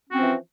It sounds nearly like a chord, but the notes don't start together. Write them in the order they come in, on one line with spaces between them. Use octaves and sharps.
C#4 F#4 C4 F3 E3